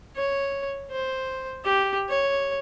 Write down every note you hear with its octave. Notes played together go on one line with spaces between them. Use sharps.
C#5
C5
G4
C#5